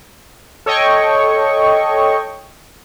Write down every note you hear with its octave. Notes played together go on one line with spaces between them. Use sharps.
A4 C#5 D#5 G5 C#6